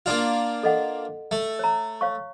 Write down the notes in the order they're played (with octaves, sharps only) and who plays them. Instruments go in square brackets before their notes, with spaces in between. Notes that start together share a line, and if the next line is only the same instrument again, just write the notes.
[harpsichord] A#3 D4 F4
[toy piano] A4 D#5 F#5
[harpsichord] A3
[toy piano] C#5 A#5
C#5 F5 C#6